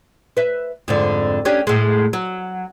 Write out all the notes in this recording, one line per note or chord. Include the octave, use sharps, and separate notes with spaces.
B4 E5
F2 G#2 D3
C#4 D4 G4
A2 G#3
F#3